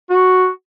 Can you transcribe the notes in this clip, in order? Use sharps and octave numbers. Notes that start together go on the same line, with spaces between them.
F#4